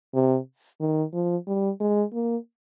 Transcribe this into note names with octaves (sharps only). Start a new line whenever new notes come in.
C3
D#3
F3
G3
G#3
A#3